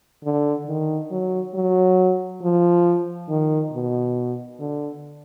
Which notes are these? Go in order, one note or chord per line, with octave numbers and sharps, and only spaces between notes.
D3
D#3
F#3
F#3
F3
D#3
B2
D3